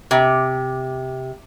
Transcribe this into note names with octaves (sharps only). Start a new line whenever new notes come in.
C3